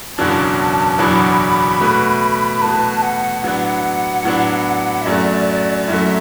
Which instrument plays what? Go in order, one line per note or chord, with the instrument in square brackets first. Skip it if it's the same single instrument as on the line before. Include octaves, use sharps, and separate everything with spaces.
[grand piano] F#1 E2 B2 F#3 D4 [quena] A5
[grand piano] F#1 E2 B2 F#3 D4 [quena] B5
[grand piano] B2 A3 F#4 B4
[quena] B5
[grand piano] B2 A3 F#4 B4 [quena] A5
[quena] F#5
[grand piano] A2 F#3 B3 D4
A2 F#3 B3 D4
[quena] E5
[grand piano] F#2 F#3 A3 [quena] D5
[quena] D5
[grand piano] F#2 F#3 A3 [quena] E5